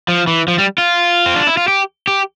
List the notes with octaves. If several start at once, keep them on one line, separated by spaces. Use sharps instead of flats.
F3
E3
F3
G3
F4
C4
D4
E4
F4
G4
G4